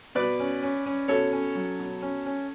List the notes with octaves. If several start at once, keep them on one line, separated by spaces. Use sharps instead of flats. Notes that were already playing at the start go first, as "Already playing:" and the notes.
B2 B4 D5
C#4
C#4
C#4
B2 A4 C#5
C#4
F#3
B2
C#4
C#4